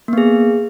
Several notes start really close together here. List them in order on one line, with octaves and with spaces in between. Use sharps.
A#3 B3 G#4